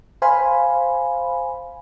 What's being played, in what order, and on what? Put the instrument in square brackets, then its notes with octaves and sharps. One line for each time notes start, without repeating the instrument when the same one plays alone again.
[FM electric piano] C5 F5 G#5 B5